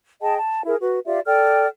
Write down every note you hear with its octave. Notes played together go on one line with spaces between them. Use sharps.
G#4 D#5 G5 A5
A5
E4 G#4 A#4
F#4 B4
F4 G4 D5 E5
A4 D5 G5 F6